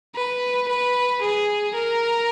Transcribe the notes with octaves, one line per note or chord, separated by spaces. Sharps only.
B4
B4
G#4
A#4